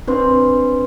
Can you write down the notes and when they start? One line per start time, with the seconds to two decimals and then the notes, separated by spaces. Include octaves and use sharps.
0.07 C4 D4 B4 C6